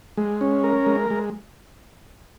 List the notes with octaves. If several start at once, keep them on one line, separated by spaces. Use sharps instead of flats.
G#3
C#4
A#4
G#3
G#3